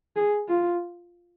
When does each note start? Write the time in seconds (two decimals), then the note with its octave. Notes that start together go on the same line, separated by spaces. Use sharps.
0.16 G#4
0.48 F4